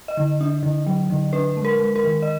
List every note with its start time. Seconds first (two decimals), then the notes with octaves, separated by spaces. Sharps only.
0.08 D#5
0.17 D3
0.41 D4
0.63 D3
0.86 F#3
1.10 D3
1.33 D4 B4
1.57 G#3
1.65 A#4
1.80 G#3
1.96 A#4
2.04 D#3
2.22 D#5